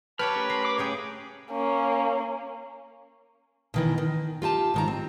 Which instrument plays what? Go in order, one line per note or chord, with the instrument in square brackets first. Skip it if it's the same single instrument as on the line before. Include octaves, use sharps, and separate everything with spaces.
[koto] G4 C#5 G5 [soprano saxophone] B4 [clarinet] A5 [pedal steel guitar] F6
[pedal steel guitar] A3 C#4 A#4
[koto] A#5 [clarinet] C6
[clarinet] D6
[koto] C#3 G#4 G5 [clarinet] C#5
[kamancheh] A#3 C#4
[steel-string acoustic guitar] B2 D#3 E3
D#3
F4 G4 G#5 A5
G#2 D#3 A#5
C4